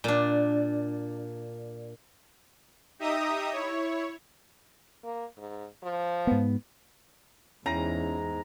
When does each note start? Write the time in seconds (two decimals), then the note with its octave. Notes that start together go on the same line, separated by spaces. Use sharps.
0.04 A#2 D4
2.99 D#4 G4 D#5 E5 A#5 D#6
3.52 E4 C#5
5.04 A#3
5.37 G#2
5.83 F3
6.27 G#2 B3
7.66 E2 G#2 C#4 E4 A#5